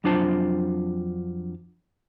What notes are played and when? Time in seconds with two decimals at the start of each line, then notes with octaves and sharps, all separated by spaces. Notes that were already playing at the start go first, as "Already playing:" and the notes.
0.04 F2 F#3 D4 F4 C5 A5